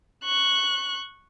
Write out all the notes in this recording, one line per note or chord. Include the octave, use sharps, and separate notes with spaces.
C#6 F#6